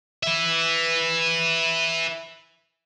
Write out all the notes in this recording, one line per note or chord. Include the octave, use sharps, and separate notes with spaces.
B4 E5